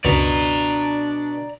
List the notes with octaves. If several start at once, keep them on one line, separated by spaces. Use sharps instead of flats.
C#2 F#2 B2 D4 D5 A#5